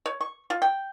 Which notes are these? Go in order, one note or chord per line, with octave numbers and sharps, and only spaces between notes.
C#5
C#6
F4
G5